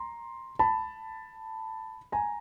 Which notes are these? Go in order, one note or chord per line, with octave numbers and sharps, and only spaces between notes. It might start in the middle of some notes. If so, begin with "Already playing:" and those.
Already playing: A#5 C6
A5 B5
G#5 A#5